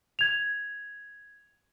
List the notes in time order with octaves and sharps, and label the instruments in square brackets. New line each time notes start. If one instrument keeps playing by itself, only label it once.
[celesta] G#6 F7